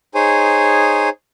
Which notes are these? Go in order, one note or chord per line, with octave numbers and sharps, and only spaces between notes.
D#4 G#4 C5 C#5 G#5